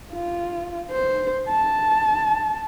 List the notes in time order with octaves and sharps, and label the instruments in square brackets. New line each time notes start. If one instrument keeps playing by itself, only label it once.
[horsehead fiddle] F4
C5
A5